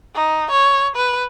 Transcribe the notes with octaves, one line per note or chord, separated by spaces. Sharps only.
D#4
C#5
B4